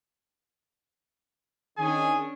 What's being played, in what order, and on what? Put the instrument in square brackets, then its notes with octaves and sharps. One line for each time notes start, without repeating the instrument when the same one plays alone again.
[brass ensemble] D#3 [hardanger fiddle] C#4 D4 [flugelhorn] G#4 [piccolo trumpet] G#5